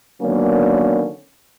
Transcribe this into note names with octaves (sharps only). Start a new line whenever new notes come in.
D3 D#3 F#3 A#3 B3 C#4